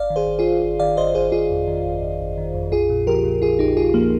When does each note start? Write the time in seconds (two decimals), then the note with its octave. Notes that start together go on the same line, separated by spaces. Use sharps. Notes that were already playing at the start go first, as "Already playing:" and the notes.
Already playing: G1 D5 F5
0.10 D#3
0.16 G#4 C5
0.27 G1
0.39 F4 G#4
0.46 G1
0.63 G1
0.79 D#3 D5 F5
0.97 G1 C5 D#5
1.14 G1 G#4 C5
1.32 G1 F4 G#4
1.50 F2
1.67 D#3
1.85 G1
2.03 G1
2.20 G1
2.38 D#3
2.54 F2
2.72 A#1 F4 G#4
2.89 A#2
3.07 F3 G4 A#4
3.24 A#2
3.42 A#1 F4 G#4
3.59 A#1 D#4 G4
3.77 A#1 F4 G#4
3.94 F3 A#3